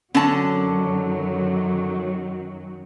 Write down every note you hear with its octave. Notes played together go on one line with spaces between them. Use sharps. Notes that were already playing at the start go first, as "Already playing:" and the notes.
F#2 D3 D#3 F#3 C#4 A5